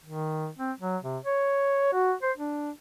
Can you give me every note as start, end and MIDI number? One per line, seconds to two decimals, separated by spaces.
0.06 0.49 51
0.59 0.72 60
0.80 0.98 54
1.03 1.18 48
1.25 1.90 73
1.93 2.14 66
2.23 2.32 72
2.37 2.71 62